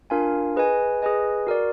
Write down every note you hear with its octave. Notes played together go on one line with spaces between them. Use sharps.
D4 F4 A#4 F5 G#5
G#4 B4 D#5 G#5
G#4 B4 D#5 G#5
F#4 A#4 D5